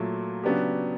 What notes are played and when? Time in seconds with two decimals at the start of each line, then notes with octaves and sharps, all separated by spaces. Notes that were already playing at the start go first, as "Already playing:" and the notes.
Already playing: A#2 F#3 A3
0.44 C#3 F#3 B3 D4 G4